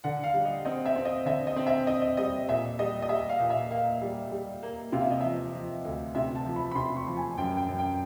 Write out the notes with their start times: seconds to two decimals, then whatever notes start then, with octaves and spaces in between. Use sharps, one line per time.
0.04 D3 F#5
0.24 F5
0.34 G3
0.45 D#5
0.65 C4 D#5
0.86 E5
0.96 C4
1.05 D#5
1.25 D3 E5
1.47 D#5
1.56 C4
1.67 E5
1.87 C4 D#5
2.02 D#5
2.17 G3 D#5
2.48 A#2 E5
2.79 G3 D#5
3.02 D#5
3.09 G3 E5
3.29 F5
3.39 A#2
3.50 E5
3.71 A#3 F5
4.02 G3
4.31 G3
4.63 A#3
4.92 C3 F5
5.01 E5
5.11 D#5
5.21 F3 E5
5.53 F3
5.85 D2
6.15 C3 E5
6.35 A5
6.46 F3
6.56 B5
6.71 B5
6.75 C3 C6
6.96 C#6
7.07 F3
7.17 G#5
7.38 F#2 G5
7.57 G5
7.68 F#2
7.78 G5